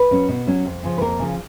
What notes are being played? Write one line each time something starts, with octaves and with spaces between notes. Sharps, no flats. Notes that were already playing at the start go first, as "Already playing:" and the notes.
Already playing: B4
F#3 C#4
B2
F#3 C#4
F2
C#3 F3
B4
F2 A#3 A#4
C#3 F3